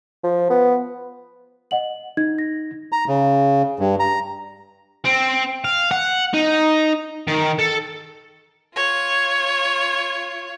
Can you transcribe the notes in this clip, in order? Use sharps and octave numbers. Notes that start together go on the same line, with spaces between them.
F3
B3
D#5 F#5 F#7
D#4 G#6
A#6
A#5
C#3
G2
A#5
C4
F5
F#5
D#4
D#3
A4
F4 C#5